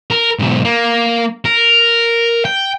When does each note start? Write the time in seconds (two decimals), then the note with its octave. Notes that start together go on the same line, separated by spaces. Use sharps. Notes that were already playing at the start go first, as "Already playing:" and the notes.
0.11 A#4
0.39 B1 G#2
0.65 A#3
1.45 A#4
2.45 G5